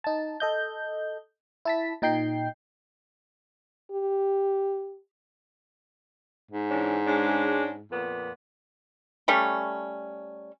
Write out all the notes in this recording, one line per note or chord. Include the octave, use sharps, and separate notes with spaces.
D#4 A5
A4 D#5 G6
E4 A5 B6
A#2 D#4 G5 G6 C7
G4
G#2
E3 C#4 D4
G#3 C#4 D4
F2 A#2 B3
G3 A3 C#4